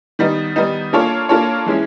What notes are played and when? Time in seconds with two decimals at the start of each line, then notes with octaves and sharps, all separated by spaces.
0.19 D#3 G3 B3 D#4
0.56 D#3 G3 B3 D#4
0.93 A#3 D4 F4 A4 C#5
1.29 A#3 D4 F4 A4 C#5
1.66 E3 G#3 C#4 E4